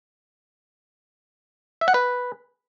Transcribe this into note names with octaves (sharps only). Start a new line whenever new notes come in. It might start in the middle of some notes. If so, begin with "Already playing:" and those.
E5
F#5
B4